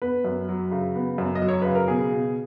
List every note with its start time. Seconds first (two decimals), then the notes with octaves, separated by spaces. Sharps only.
0.02 B3 B4
0.25 F#2
0.49 F#3
0.71 C#3
0.95 B3
1.18 F#2
1.35 D#5
1.42 F#3
1.48 C#5
1.62 C#3 B4
1.75 A#4
1.88 B2 G#4
2.12 B2